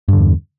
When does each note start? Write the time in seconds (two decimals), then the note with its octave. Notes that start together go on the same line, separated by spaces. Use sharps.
0.08 G2
0.13 D3
0.18 E2